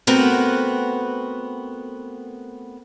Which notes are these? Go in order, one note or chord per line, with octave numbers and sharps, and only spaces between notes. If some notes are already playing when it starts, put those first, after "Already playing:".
A3 B3 C4 F#4 A#4 B4